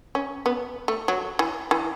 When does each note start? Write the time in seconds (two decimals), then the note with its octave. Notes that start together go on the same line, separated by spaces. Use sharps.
0.15 C#4
0.46 B3
0.88 A3
1.08 F#3
1.39 E3
1.71 E3